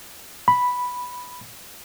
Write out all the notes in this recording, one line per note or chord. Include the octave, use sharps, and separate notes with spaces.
B5